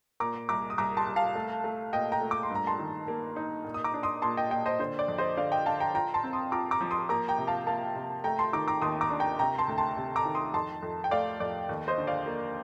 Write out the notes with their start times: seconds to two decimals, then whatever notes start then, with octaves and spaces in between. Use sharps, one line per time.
0.20 A#2 A#5 D6
0.49 C2 A#5 D6
0.70 D#6
0.78 C2 A#5 D6
0.97 A5 C6
1.07 C2
1.16 F5 A5
1.35 A3
1.64 A3
1.93 A#2 D#5 G5
2.12 G5 A#5
2.21 A3
2.31 D6
2.43 C6
2.50 G2 A#5
2.67 A5 C6
2.79 D#3
3.08 A#3
3.36 D#4
3.64 A#2
3.74 D#6
3.84 A#5 D6
3.94 D4
4.03 C6 D#6
4.22 A#2 A5 C6
4.37 D#5 G5
4.51 A#2 D#5 G5
4.66 C5 D#5
4.79 D3 C5
4.99 D5
5.08 F2
5.18 C5 D#5
5.37 D3 D5 F5
5.52 D#5 G5
5.66 D3 F5 A5
5.80 G5 A#5
5.95 F4 G5 A#5
6.14 A5 C6
6.24 C4
6.33 C6 D#6
6.52 F4 A#5 D6
6.71 A#5 D6
6.81 F3
6.91 C6 D#6
7.09 A#3 A#5 D6
7.28 G5 A#5
7.38 C3
7.47 F5 A5
7.67 A#3 F5 A5
7.96 C3
8.24 A3 G5 A#5
8.39 A5 C6
8.53 D#3 A#5 D6
8.68 A#5 D6
8.82 D#2 C6 D#6
9.01 A#5 D6
9.10 D4
9.20 G5 A#5
9.39 C3 G5 A#5
9.58 A5 C6
9.68 D2
9.78 A5 C6
9.97 C3
10.16 A#5 D6
10.25 D#3
10.35 C6 D#6
10.54 F2 A5 C6
10.83 F2
11.04 G5
11.11 A3 D5 F5
11.40 F2 D5
11.69 D#2
11.88 C5 D#5
11.98 D3
12.07 D5 F5
12.26 A#3